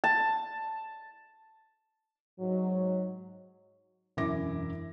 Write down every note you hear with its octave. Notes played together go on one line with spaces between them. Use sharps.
A5
G#2 F#3
E1 F#2 E3 E4 D6 A#6